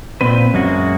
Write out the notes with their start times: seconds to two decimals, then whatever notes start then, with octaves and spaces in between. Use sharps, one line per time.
0.21 A#2 C4 B4
0.54 F#2 G#3 A#3 F#4